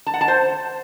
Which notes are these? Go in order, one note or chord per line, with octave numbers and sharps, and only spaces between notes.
A5
F#5
A5
C5